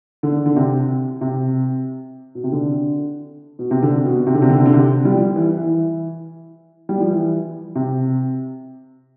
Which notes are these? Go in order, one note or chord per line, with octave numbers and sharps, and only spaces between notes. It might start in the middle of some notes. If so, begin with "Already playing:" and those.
D3
D3
C3
C3
B2
C3
D3
B2
C3
D3
B2
C3
D3
C3
D3
C3
D3
C3
G3
F3
E3
E3
G3
F3
E3
C3